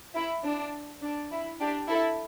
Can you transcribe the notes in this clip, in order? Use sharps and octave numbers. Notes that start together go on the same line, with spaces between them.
E4
D4
D4
E4
D4 G4
E4 A4